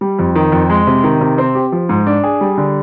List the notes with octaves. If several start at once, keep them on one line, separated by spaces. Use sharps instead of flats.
G3
F2
D#3
F2
G#3
C3
D#3
C3
C4
G4
F3
G#2
D4
G#4
G3
D3